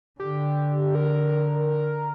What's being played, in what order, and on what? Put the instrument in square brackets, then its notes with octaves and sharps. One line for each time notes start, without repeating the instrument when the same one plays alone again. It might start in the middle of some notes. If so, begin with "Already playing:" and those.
[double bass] D3 [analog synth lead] G4
[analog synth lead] A#4